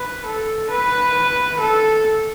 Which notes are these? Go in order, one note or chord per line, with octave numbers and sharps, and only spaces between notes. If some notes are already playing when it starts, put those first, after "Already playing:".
Already playing: B4
A4
B4
A4